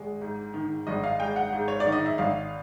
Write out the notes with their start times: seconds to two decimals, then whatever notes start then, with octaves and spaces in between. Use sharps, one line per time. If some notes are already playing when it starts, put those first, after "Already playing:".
Already playing: G#1 G#3
0.21 G#2
0.54 D#3
0.87 G#1 D#5
1.04 F5
1.20 G#3 G5
1.36 F#5
1.53 G#2
1.68 C#5
1.80 D5
1.86 D#3
1.92 D#5
2.06 E5
2.18 G#1 F5